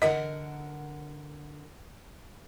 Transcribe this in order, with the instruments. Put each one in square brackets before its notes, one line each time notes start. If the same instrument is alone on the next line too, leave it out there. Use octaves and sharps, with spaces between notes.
[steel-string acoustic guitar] D3 A#4 F#5 [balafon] D#5